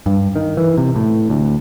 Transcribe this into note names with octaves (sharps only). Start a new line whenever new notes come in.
G2
D#3
E3
C3
A2
D2